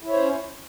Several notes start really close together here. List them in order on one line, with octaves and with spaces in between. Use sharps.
E4 C#5 C5 C#4